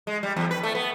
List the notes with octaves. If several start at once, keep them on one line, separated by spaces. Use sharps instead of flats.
G#3
G3
E2
B4
A3
B3